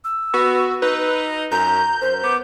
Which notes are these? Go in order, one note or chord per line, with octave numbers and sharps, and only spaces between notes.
E6
B3 F#4
D#4 B4
F#2 A#5 G6
F#2 C5
B3 D6